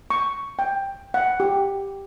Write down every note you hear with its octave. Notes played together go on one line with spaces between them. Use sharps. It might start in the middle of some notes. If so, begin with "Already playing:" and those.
C#6
G5
F#5
G4